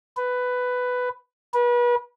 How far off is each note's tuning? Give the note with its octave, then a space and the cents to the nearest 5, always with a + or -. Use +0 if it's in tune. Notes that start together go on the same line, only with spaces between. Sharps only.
B4 +10
B4 -35